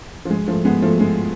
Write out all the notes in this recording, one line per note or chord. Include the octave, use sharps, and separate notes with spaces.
F3
G#3
F3 A3
G#3 B3
F3 A3
G#3